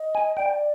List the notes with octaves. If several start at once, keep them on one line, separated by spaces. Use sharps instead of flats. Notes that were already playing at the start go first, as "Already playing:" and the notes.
Already playing: D#5
G#5
D5 G5